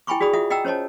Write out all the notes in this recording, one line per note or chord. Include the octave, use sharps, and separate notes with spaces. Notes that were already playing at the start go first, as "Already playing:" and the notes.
E4 G5 G#5 B5 C#6 D6
F#4 G#4 D5 B5 D#6
F4 E5 F#5 D#6
D#5 F#5 G5 A#5 E6
C#4 C5 C#5 D#5 A5